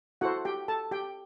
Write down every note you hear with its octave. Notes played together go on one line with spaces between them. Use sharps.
E4 F#4 A4 C5 F#5
G4 G5
A4 A5
G4 G5